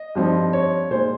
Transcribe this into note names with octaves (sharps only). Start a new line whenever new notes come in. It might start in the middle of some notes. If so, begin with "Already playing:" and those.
Already playing: D#5
G2 F3 C4 D#4
C#5
A#2 G#3 D#4 C5